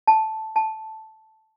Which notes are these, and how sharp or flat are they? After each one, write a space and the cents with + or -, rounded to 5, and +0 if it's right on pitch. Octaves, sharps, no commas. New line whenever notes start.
A5 -5
A5 -5